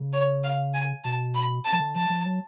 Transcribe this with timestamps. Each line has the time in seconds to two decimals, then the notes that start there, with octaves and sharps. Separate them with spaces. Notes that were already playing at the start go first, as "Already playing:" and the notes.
Already playing: C#3
0.13 C#5
0.44 F5
0.74 G#5
1.04 B2 A5
1.35 B5
1.65 A5
1.72 F3
1.80 D3
1.95 F3 A5
2.09 F3
2.25 F#3